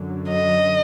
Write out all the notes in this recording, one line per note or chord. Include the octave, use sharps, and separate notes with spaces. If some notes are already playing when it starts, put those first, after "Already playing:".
Already playing: F#2 D3 F#3
D#5